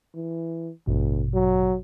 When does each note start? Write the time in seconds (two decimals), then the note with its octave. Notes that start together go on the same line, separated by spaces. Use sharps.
0.15 E3
0.87 A1 D2 G2 B2
1.34 F#3